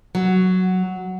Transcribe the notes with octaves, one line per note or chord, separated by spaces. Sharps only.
F#3